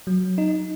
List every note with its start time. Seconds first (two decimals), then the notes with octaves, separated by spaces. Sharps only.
0.07 F#3
0.38 D#4